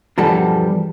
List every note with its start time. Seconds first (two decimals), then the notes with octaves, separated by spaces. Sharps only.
0.18 E2 G2 B2 F3 G3 A4